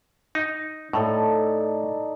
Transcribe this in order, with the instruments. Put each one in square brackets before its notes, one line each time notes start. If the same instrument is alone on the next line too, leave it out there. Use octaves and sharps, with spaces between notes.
[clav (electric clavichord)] D#4
[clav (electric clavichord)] A2 [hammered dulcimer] D#4 A4 D5